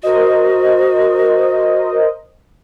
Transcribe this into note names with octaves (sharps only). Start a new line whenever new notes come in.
F#4 A#4 C5 D#5